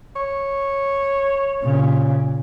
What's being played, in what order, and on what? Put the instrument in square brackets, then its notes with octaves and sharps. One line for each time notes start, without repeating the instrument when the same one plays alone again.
[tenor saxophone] C#5
[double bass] A#2 C#3